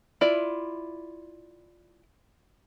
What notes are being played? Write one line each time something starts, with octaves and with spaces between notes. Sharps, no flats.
E4 F4 D5